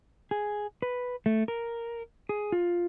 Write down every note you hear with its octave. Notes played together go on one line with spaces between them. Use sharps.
G#4
B4
A3
A#4
G#4
F4